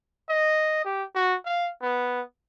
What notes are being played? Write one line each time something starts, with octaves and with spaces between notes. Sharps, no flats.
D#5
G4
F#4
F5
B3